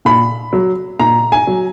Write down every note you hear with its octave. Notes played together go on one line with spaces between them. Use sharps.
A#2 B5
F#3
A#2 A#5
G#5
F#3